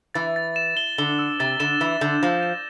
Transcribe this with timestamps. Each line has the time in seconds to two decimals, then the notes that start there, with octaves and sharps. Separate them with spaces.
0.15 E3 A6
0.36 A6
0.56 E7
0.77 G7
0.98 D3 G7
1.19 E6
1.40 C3 A6
1.60 D3 E7
1.80 E3 G7
2.01 D3 G6
2.22 F3 A#6
2.43 E7